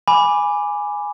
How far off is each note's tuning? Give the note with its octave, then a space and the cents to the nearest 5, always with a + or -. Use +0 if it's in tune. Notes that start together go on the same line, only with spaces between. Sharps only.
G#5 -5 B5 +0 D6 +0